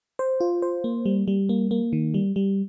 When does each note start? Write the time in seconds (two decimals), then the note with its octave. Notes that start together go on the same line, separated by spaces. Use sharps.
0.19 C5
0.40 F4
0.62 C5
0.84 A#3
1.05 G3
1.28 G3
1.49 A#3
1.71 A#3
1.93 D#3
2.14 G3
2.36 G3